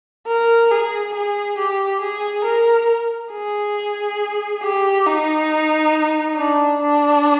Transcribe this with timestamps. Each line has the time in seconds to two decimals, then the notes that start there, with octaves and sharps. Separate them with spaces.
0.27 A#4
0.71 G#4
1.14 G#4
1.58 G4
2.01 G#4
2.45 A#4
3.32 G#4
4.63 G4
5.06 D#4
6.37 D4
6.81 D4